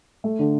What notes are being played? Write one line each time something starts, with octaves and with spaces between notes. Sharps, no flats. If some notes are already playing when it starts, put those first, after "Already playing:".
A3
D3